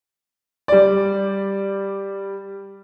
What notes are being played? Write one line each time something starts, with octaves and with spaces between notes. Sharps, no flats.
G3 D5